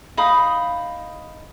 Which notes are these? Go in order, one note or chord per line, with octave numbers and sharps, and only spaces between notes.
D#4 F5 B5 D#6